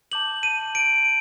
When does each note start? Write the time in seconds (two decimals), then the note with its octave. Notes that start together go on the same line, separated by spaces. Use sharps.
0.12 A5 D6 G6 F#7
0.43 D#7
0.75 D7